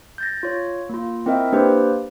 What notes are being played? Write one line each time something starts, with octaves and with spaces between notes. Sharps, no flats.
G6 A6 A#6
F4 C#5
A#3 F4
C4 E4 A#4 D#5 E5 G5
A#3 D4 G4 B4 C5